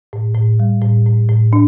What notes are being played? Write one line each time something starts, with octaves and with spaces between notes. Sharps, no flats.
A2
A2
G3
A2
A2
A2
D4